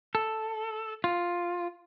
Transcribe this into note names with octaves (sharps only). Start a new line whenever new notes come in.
A4
F4